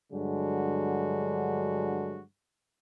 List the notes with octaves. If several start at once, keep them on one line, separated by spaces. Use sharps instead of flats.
G2 D3 F#3 G#3 F#4